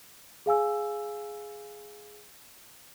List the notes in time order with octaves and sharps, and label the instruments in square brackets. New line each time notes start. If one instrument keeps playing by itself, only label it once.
[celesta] G#4 F5 G#5 E6